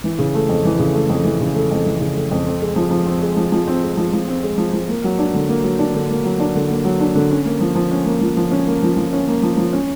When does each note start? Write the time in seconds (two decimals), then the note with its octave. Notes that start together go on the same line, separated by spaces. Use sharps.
0.04 E3
0.19 C#3
0.34 A3
0.49 F2
0.65 E3
0.79 C#3
0.94 A3
1.09 F2
1.24 E3
1.40 C#3
1.55 A3
1.71 F2
1.86 E3
2.01 C#3
2.15 A3
2.31 F2
2.46 C4
2.61 G#3
2.76 F3
2.91 F3
3.06 C4
3.22 G#3
3.36 F3
3.52 F3
3.67 C4
3.83 G#3
3.97 F3
4.13 F3
4.28 C4
4.43 G#3
4.58 F3
4.73 F3
4.89 A#3
5.04 F#3
5.19 D4
5.34 D3
5.49 A#3
5.64 F#3
5.79 D4
5.94 D3
6.10 A#3
6.25 F#3
6.40 D4
6.55 D3
6.70 A#3
6.85 F#3
7.00 D4
7.15 D3
7.31 C#4
7.45 A#3
7.60 F3
7.75 F3
7.91 C#4
8.06 A#3
8.21 F3
8.37 F3
8.51 C#4
8.67 A#3
8.83 F3
8.97 F3
9.13 C#4
9.28 A#3
9.42 F3
9.58 F3
9.73 C#4